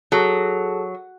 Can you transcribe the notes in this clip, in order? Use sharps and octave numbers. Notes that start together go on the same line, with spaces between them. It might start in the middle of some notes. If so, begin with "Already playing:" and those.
F#3 G#4 A4 A5